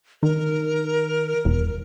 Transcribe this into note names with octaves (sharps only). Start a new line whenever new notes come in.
D#3 A#4
E1